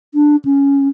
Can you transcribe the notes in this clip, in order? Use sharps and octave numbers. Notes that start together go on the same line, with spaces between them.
D4
C#4